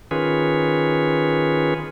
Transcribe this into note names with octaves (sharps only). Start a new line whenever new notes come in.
D#3 C#4 F4 G#4 B4